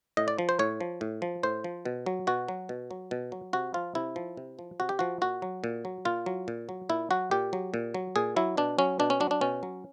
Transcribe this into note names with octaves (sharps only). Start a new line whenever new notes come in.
A2 D#5
D5
F3
C5
A2 C#5
F3
A2
F3
A2 C5
F3
B2
F#3
B2 F#4
F#3
B2
F#3
B2
F#3
C3 F#4
F3 F4
C3 E4
F3
C3
F3
C3 F#4
G4
F3 F#4
A#2 F#4
F#3
A#2
F#3
A#2 F4
F#3
A#2
F#3
A#2 E4
F#3 F#4
A#2 G4
F#3
A#2
F#3
A#2 G#4
F#3 E4
B2 D4
F#3 C#4
B2 D4
C#4
F#3 D4
D4
B2 C#4
F#3